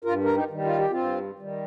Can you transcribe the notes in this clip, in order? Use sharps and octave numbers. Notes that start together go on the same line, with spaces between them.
G2 F4 A#4
A#4
D#4 G4
D#3 G3
F4
G4
G2 C4 F4
D#3 G3